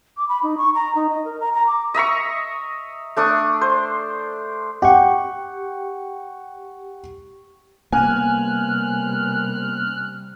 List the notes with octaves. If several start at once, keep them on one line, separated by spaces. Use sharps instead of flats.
D6
B5
D#4
C#6
A#5
D#4
D#5
A#4
A#5
A#5
D6
D#5 E5 A#5 C#6
A3 D4 C#6 D#6
C5
G4 F#5 G5 C#6
C3 G3 A#3 B3 C#4 G#5 F6 F#6